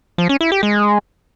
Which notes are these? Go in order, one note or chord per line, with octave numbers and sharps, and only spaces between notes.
F3
C#4
E4
G4
G#3